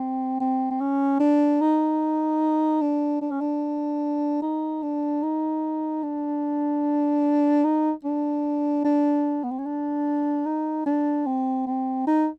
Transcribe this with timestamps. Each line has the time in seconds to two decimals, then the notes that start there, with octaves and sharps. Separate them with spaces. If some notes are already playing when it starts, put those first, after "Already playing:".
Already playing: C4
0.40 C4
0.71 C4
0.80 C#4
1.20 D4
1.61 D#4
2.81 D4
3.21 D4
3.31 C#4
3.40 D4
4.42 D#4
4.83 D4
5.23 D#4
6.03 D4
7.64 D#4
8.04 D4
8.84 D4
9.44 B3
9.51 C4
9.58 C#4
9.65 D4
10.46 D#4
10.86 D4
11.26 C4
11.67 C4
12.07 D#4